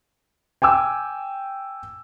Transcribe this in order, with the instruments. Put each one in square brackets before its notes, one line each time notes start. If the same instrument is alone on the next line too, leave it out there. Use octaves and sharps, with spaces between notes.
[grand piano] G5 G#5 D6 E6